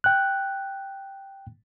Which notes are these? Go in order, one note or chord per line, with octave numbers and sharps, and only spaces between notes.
G5 F#6